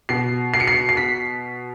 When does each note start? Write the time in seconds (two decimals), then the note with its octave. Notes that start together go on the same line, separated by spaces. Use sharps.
0.09 B2 C7
0.54 C7
0.60 C#7
0.67 C7
0.89 C7
0.97 B6